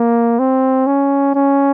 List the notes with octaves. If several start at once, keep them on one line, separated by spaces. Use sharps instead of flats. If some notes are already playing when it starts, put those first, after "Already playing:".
Already playing: A#3
C4
C#4
C#4